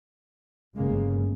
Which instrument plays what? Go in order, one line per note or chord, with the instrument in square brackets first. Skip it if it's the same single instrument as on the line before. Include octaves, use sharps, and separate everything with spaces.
[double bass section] G1 F#2 C#3 G#3 A#3